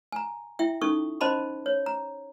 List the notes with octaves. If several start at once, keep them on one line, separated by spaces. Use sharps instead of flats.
G#5 A#5
E4 E5 G5
C#4 D#4 A4 C#6 D#6
C#4 C5 D#5 A5 B5 C6
C#5
A#5